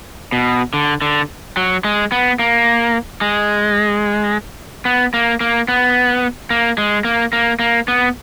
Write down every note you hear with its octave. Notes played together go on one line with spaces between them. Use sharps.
B2
D3
D3
F#3
G#3
B3
A#3
G#3
B3
A#3
A#3
B3
A#3
G#3
A#3
A#3
A#3
B3